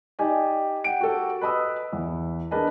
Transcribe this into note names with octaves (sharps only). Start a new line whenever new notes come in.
D#4 G4 D5 D#5 G5 G#5
F#5 G5 D7
F#4 G4 A4
B4 D#5 B5 D#6 E6
E2
D4 G#4 A#4 B4 D#5 A5